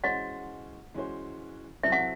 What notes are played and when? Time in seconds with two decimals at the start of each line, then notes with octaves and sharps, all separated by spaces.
0.04 E3 G#3 C#4 F#4 C5 D#5 F#5
0.94 E3 G#3 C#4 F#4 C5
1.83 C3 F#3 C4 E4 A4 E5
1.92 F#5